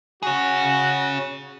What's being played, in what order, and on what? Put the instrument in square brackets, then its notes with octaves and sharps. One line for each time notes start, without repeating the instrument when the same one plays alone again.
[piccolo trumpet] F#4 [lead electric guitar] G#4 C#5